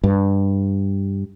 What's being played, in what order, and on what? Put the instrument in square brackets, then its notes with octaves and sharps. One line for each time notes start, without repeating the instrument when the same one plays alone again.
[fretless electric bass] G2